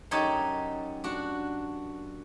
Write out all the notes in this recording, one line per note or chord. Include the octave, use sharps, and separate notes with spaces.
F#2 D#4 G4 C#5 A5
D4 F#4